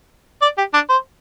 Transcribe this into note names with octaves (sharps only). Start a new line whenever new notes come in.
D5
G4
D4
C5